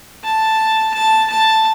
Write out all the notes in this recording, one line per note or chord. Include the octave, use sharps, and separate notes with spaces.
A5
A5
A5